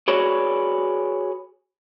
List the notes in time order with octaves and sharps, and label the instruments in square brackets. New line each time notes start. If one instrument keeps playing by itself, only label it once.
[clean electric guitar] F#4 G#4 B4 C#5 D5